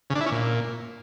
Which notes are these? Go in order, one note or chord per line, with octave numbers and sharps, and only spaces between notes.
C#3
D4
E4
C#4
A#2